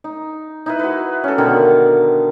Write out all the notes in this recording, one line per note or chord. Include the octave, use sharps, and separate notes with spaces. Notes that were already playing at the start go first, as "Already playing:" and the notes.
D#4
D#4 E4 B4
F#4 B4
C#4 A4
B2 D3 D#3 A#4
F5